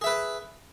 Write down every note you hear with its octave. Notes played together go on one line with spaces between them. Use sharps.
G#4 B4 E5